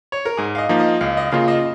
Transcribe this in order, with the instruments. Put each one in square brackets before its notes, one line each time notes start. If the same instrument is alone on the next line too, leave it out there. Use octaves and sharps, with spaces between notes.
[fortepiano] C#5
A#4
[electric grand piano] G#2 [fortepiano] G#4
[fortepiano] F5
D#5
[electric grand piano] F3 A#3 D#4
[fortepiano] D#5
[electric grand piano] C#2 [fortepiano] F5
[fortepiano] D#5
[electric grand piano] C#3 A#3 F4 [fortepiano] F5
[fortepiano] D#5